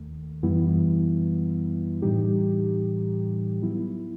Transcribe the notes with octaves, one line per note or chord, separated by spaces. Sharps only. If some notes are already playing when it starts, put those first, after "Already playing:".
Already playing: D#2 D#3 A3
F#2 E3 G3 B3 E4
A2 E3 G3 D#4 G4
F#3 B3 E4